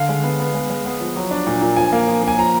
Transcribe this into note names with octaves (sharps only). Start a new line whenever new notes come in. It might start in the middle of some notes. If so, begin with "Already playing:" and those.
Already playing: D3 F5
G#3
B3
B3
G#3
G#3
B3
F3
F#3
D4
A#2
A#2
F3 G#5
A#3
F3
A#3 G#5
F3 A#5